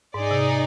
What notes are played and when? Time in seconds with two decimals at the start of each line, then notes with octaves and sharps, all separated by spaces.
0.14 G#2 D#4 G#4 D5
0.31 C3